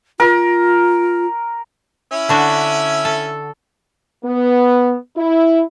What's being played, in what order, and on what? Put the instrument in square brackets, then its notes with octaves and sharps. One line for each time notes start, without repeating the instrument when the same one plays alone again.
[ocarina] F4 [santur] A#4
[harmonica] C#4 E4 E5
[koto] D3 D4 F#4
A4
[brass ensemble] B3
E4